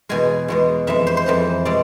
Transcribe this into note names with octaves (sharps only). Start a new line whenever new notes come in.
E2 B2 G#3 G#5
E2 B2 G#3
F2 E3 G#3 E5
C5
C5
F2 E3 G#3
B2 G#3 D5